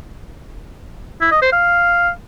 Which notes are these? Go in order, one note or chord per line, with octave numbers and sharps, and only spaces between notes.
E4
D#5
C5
F5